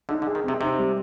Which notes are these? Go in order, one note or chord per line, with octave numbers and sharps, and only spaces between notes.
D3 D#4
D3
G#4
D#3
C3 C4
C3 D#4
G3